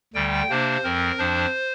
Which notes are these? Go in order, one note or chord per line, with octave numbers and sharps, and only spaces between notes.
D2 D3 G3 G5
C3 A#3 D4 C5
F2 F3 C4 A#4
F2 F3 D4 C5